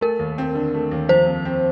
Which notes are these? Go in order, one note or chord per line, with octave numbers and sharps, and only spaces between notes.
A3 A#4
D#2
C4
D3
A3
D#2
F3 C5
F2
C4